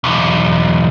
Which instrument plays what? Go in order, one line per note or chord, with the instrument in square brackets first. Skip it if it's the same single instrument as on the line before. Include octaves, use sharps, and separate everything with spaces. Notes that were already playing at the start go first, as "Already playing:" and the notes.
[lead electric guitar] B1 E2